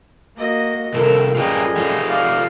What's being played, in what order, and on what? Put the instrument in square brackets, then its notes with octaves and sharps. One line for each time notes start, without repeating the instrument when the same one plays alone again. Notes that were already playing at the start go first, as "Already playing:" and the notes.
[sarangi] A#3 [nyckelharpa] F#4 D#5
[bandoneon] F2 [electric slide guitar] C3 G3 F4 [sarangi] A4 [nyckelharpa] A#4
[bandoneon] F#2 A2 G3 [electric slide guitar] F4 B4 G5 [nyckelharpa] G#4 [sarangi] D#5
[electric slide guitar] A3 F4 G4
[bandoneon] D5 F5